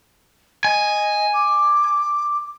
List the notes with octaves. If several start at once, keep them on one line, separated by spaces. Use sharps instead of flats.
D#5 G#5
D6